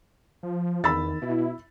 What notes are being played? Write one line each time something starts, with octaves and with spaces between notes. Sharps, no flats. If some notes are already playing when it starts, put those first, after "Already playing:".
F3
E2 D#3 B5 E6 A6
B2 E4